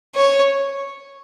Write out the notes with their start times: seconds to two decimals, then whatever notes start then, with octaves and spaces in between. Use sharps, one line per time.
0.15 C#5